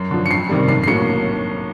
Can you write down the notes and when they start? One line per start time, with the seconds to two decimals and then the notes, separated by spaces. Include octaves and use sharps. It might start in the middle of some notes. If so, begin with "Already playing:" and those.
Already playing: F#2 C7
0.11 D3 F3
0.26 C#7
0.31 F2 C7
0.49 C3 D#3 G3
0.68 B1 C7
0.84 C7
0.87 A2 F#3 A#3 C#7